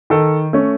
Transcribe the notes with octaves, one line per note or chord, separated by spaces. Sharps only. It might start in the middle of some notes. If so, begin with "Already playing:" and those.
D#3 A4
A3 C#4